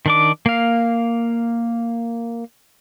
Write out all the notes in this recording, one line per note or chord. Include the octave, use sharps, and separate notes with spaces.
D#3 D4 D6
A#3 F5